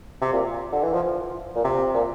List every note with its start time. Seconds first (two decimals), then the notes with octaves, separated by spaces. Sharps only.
0.22 C3
0.33 A#2
0.73 D3
0.83 E3
0.93 F3
1.55 A#2
1.64 C3
1.94 A#2